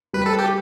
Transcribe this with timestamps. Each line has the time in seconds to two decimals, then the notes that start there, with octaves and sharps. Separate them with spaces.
0.13 G3 B4
0.26 A4
0.39 G4